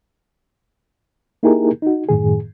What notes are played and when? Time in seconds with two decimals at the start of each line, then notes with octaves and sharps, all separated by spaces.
1.43 A#3 D#4 E4 G4 G#4 A#4
1.82 D#4 F#4
2.09 F#2 A2 D#3 G#4